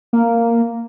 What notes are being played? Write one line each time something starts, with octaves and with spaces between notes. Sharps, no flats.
A#3